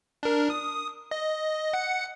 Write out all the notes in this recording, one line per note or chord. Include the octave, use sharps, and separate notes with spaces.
D4 A#4
D#6
D#5
F#5 C#7